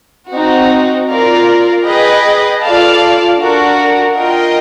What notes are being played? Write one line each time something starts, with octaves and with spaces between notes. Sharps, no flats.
C4 D#4 F#4
F4 A#4 D5
G#4 B4 D#5 G5
F4 A4 D5 F5 A5
D4 F#4 A#4
F4 A#4 D#5 G5